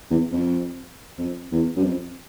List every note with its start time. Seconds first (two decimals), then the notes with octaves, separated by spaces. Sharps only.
0.10 E2
0.32 F2
1.18 F2
1.52 E2
1.76 F#2
1.83 F2